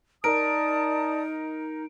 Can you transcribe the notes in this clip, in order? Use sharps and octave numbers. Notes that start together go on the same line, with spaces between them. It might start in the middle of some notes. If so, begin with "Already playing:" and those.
D#4 A#4 D5 A5 D#6 D7